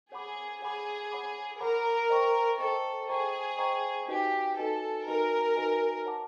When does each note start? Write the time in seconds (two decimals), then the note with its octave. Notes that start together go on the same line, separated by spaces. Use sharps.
0.12 G#4 C#5 F#5 B5 D6
0.61 G#4 C#5 F#5 B5 D6
1.11 C#5 F#5 B5 D6
1.60 A#4 C#5 F#5 B5 D6
2.09 C5 D#5 G5 A#5 C#6
2.59 A4 C5 D#5 G5 A#5 C#6
3.09 G#4 C5 D#5 G5 A#5 C#6
3.58 C5 D#5 G5 A#5 C#6
4.08 D#4 F#4 G4 B4 D#5 G#5
4.57 D#4 F#4 A4 B4 D#5 G#5
5.07 D#4 F#4 A#4 B4 D#5 G#5
5.56 D#4 F#4 B4 D#5 G#5
6.05 C#5 F#5 A5 D6